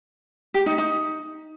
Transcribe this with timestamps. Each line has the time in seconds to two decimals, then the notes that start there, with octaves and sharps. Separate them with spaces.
0.54 G4
0.66 D#4
0.78 D#4